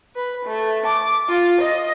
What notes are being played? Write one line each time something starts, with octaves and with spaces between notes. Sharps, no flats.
B4
A3
D6
F4
D#5